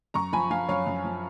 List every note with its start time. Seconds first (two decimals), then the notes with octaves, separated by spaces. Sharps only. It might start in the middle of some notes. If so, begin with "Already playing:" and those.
0.14 F#2 A#5 C#6
0.33 F3 G#5 B5
0.50 F3 F5 G#5
0.69 F#2 C#5 F5
0.87 F#2
1.04 F3